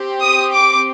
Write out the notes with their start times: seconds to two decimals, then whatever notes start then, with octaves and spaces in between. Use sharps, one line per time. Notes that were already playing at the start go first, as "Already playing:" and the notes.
Already playing: C4 G4
0.22 D#6
0.54 D6